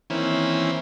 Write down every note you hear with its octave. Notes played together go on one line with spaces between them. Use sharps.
D#3 E3 A#3 C4 C#4 E4